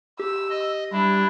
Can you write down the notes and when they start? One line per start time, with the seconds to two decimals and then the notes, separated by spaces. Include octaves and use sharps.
0.19 G4 E6
0.50 D#5
0.93 G3 D4 E4